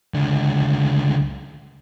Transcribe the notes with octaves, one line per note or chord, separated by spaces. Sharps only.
C#2 D3